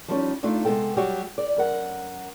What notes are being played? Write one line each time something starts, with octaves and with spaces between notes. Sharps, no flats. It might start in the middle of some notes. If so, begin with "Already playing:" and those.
F3 G3 C#4 D#4
A3 D4 D#4 F4
C3 G#3 B3 A4 G5
F#3 G3 F#4 G4
D5
F#2 A#4 F#5